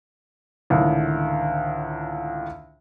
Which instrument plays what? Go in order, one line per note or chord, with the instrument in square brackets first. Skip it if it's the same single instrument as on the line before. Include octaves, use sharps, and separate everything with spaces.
[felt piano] C#2 A2 D3 D#3